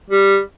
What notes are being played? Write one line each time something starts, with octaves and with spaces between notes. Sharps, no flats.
G3